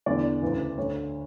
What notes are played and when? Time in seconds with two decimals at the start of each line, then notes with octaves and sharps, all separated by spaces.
0.06 E2 D3 D5
0.42 D2 C#3 E3
0.78 D2 D3 C#5